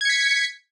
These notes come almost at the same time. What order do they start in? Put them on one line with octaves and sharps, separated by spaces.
G#6 C#7 B6